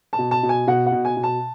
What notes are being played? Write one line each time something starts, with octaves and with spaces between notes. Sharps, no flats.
A5
B2
A5
B2
G#5
B2 F#5
F#5
B2
G#5
B2
A5